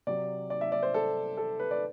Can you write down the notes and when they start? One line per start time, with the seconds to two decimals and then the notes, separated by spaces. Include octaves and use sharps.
0.07 C3 F#3 D5
0.50 D5
0.61 E5
0.72 D5
0.83 C5
0.94 A4
1.37 A4
1.59 B4
1.71 D5